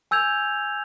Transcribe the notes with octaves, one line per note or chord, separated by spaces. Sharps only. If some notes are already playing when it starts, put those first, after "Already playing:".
G#5 E6 G6 G#6 F7